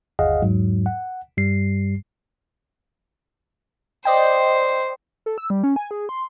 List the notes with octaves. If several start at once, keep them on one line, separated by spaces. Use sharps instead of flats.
G1 D#2 G#4 D#5 F5 F#5
E2 G#2 F#3
F#5
G2 G3 C7
C5 D5 D#5 G5
A4
E6
G3
C#4
G#5
G#4
C6